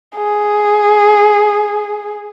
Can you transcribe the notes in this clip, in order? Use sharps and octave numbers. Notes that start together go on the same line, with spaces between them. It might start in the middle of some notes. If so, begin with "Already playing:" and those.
G#4